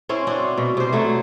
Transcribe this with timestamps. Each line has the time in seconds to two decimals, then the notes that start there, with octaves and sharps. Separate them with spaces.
0.09 C4 C#4 E4
0.27 C4 D4 F#4
0.58 B2
0.77 C3 C5
0.93 F#3 A3 E4